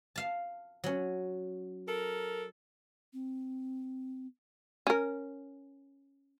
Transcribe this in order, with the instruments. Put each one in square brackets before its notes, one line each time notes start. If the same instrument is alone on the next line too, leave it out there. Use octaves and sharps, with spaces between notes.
[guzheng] F5 A5
F#3 C#4
[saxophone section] A4 A#4
[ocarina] C4
[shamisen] C#4 A#4